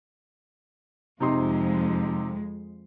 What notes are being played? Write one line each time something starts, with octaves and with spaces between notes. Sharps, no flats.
F2 C3 G#3 D#4 C6